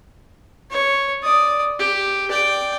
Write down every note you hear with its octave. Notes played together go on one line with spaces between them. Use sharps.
C#5
D5 D#6
G4
D5 G5